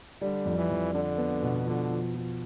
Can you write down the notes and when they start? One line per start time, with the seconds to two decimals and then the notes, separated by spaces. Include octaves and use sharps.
0.21 D3 G3
0.45 F2
0.58 E3
0.70 F2
0.94 D3 D4
1.18 B3
1.42 B2
1.66 D3 F3
1.90 F3
2.15 F3